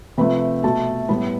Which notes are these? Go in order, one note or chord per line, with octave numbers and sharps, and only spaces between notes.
C3 F3 A3 B4 B5
B2 A3 A4 A5
A2 G3 B3 B4 B5